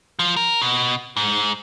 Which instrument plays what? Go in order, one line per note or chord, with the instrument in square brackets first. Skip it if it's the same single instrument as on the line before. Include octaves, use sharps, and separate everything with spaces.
[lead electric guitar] F3
A#4
B2
G#2